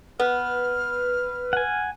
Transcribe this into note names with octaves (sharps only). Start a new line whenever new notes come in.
B3 B4 F6
F#5 G#5